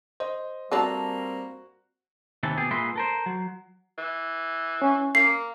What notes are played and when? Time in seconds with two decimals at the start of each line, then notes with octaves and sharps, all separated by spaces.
0.20 C5 D#5
0.72 G3 A3 A#3 C4 D4 F#4 A4
2.43 D#2 C3 D#3 E3 A4
2.58 B2 G4 G#4
2.71 A#2 G#3 B4 D#5 E5 C6
2.96 A4 A#4 C5
3.26 F#3
3.98 E3
4.82 C#4
5.15 A#3 C7